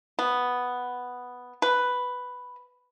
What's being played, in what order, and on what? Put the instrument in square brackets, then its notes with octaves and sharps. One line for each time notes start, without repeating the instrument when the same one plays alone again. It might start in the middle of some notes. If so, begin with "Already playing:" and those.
[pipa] B3
B4